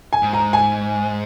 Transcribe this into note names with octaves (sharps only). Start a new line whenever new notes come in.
G#5
G#2
A#5
G#5